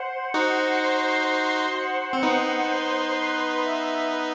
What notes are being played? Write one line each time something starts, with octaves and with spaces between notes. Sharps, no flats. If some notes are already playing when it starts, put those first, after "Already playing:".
Already playing: C5 F#5
D#4 F#4 C5
C6
C5
F#5
C4
B3 D#4 C5
C6
B4
E5
B4